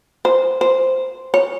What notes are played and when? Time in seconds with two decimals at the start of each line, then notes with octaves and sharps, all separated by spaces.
0.25 C5
0.61 C5
1.34 C#5